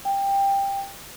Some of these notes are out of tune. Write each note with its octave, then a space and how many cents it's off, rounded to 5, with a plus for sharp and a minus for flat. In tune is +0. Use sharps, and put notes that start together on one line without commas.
G5 +15